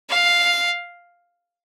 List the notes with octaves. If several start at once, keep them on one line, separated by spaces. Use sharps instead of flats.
F5